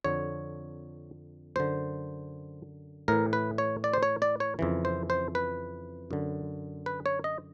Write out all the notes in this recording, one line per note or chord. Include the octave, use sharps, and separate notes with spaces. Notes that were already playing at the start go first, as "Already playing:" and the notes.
F2 D3 C#5
F#2 D3 C5
A2 E3 A#4
B4
C#5
D5
C5
C#5
D5
C#5
F2 C#3 E3
C5
C5
B4
F#2 D3
B4
C#5
D#5